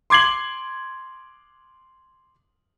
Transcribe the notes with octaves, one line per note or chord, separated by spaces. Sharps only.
C6 D6 G#6 C7 F#7